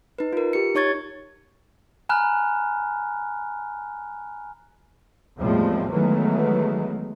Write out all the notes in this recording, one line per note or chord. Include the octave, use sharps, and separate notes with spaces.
D#4 B4
F4 A#4
G4 C#7
D#4 C#5 C#6 G#6 A6
G#5 A#5 B5 F6 F#6
E2 A2 F3 G3 G#3 C4
D#3 E3 F#3 G#3 A3 B3